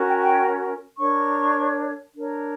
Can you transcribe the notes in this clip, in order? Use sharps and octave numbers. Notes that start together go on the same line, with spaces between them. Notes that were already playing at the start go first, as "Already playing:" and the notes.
Already playing: C#4 F#4 A#4
G5
G5
D4 A#4 C#5 C#6
D4 A#4 C#5